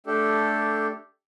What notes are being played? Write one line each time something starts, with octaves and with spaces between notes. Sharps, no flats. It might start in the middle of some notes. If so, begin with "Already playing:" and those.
A3 D4 G4 A4